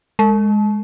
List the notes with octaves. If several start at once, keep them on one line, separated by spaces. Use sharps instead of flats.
G#3